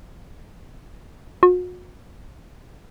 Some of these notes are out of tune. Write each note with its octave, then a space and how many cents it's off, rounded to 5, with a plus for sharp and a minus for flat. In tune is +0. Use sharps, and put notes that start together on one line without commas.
F#4 -40